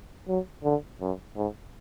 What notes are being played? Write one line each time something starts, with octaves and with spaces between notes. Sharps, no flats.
F#3
D3
F#2
G#2